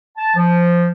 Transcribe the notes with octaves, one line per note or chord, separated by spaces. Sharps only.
A5
F3